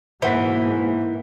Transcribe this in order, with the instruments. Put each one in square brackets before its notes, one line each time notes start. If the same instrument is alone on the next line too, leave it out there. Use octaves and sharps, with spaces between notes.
[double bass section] G#2 B2 A#3 [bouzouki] E3 [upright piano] C5 F#5 B6